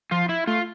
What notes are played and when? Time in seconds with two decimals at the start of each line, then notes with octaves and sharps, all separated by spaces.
0.11 F3 F4
0.29 E4
0.47 A3 F4